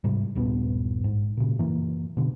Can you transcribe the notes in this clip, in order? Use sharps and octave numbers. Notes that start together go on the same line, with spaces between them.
G#2 C3 G3
D#1 A#1 G2 B3
G#2
A#2 C#3
F#2 E3 A#3
B2 D3